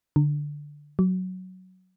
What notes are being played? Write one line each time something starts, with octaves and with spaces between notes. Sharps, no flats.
D3
F#3